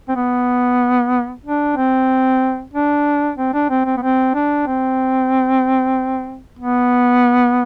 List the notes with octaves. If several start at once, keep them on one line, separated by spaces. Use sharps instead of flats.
C4
B3
D4
C4
D4
C4
D4
C4
C4
B3
C4
D4
C4
B3